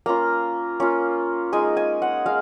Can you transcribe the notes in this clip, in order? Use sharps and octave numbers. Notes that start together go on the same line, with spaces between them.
A#3 C#4 F4 A#5
A#3 C#4 F4
G#3 D#4 G#5
G#5
F#5
G#3 F5